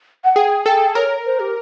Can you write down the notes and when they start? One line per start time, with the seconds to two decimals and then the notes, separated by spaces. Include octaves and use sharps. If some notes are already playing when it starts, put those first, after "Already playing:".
0.24 F#5
0.36 G#4 G5
0.66 A4 G5
0.95 A#4 C#5
1.26 C5
1.40 G4